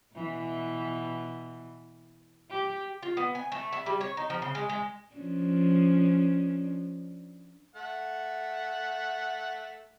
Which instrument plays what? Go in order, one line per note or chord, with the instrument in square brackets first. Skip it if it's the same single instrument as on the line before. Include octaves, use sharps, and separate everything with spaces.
[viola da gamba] B2 E3
G4
[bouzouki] F4
B3
G#5
A3
E4
G3
C#5
D#4
F3
C#3
G#3
G#3
[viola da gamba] F3 C#4 D4
[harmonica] A3 F#5